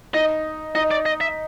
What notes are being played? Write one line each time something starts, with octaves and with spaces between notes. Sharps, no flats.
D#4 D#5
D#4 D#5
D5
D#5
E5